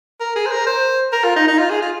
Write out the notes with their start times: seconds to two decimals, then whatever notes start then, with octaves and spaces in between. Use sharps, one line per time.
0.20 A#4
0.36 G#4
0.46 C5
0.51 A#4
0.67 C5
1.12 A#4
1.24 F4
1.36 D#4
1.48 D#4
1.59 F4
1.70 G#4
1.82 F4